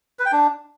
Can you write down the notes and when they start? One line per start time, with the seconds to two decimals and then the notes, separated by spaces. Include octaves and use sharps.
0.19 B4
0.26 G5
0.32 D4